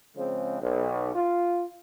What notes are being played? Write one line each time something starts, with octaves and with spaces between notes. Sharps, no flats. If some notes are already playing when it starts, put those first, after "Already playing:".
C#3 F3 G#3 C4
B1
F4